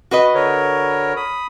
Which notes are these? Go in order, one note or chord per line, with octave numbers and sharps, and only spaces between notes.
F#4 B4 D#5
D3 A#4 C#5
B5 D#6